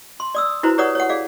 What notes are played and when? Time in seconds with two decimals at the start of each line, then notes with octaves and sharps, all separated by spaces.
0.20 C6
0.35 D5 D#6 E6
0.63 E4 F#4 B4 C5 A#5
0.78 G4 B4 C#5 D5 F#5 D#6
0.95 C#5 F#5
1.09 G#4 D5 F5